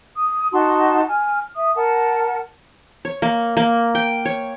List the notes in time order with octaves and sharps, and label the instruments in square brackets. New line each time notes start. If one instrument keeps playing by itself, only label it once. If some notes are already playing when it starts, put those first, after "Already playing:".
[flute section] D#6
D#4 F#4 A5 C6
G#5 F6
E5 D#6
A#4 F#5 A5
[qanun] C#5
A#3
A#3
G5
C#5